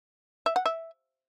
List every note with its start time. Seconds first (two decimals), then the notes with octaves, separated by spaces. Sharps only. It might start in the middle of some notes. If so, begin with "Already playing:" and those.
0.46 E5
0.56 F#5
0.66 E5